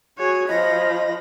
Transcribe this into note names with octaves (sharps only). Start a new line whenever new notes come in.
F#4 G#4 C#5
F3 D#5 B5 A#6